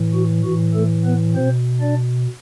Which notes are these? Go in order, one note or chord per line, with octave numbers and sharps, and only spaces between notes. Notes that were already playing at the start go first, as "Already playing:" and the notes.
Already playing: A2 E3
F#4
A2 E3 F#4
A3 A4
B3 B4
B2 C4 C5
D4 D5